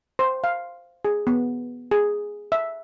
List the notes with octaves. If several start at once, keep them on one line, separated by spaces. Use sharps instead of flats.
C5
F5
G#4
B3
G#4
E5